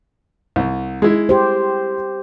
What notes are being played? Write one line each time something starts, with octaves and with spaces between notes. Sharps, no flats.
C2
G#3 E4
G4 C5